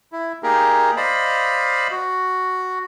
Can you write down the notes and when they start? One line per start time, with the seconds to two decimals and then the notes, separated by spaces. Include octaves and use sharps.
0.12 E4
0.43 A#3 D#4 G4 G#4 A#4
0.97 C5 D5 D#5 F5 B5
1.91 F#4